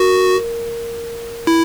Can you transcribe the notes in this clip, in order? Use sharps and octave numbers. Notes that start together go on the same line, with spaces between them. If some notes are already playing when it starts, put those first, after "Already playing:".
Already playing: F#4 A#4
E4